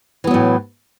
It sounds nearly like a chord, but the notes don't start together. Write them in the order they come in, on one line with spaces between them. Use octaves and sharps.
E3 B3 F#3 A2